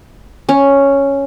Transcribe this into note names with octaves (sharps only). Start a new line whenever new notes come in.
C#4